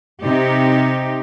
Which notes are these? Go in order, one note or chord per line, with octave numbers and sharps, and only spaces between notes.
C3 D#4 G4